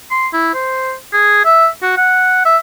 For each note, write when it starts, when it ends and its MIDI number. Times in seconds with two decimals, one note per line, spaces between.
0.11 0.28 84
0.33 0.52 64
0.54 0.94 72
1.13 1.45 68
1.45 1.68 76
1.83 1.97 66
1.97 2.44 78
2.45 2.57 76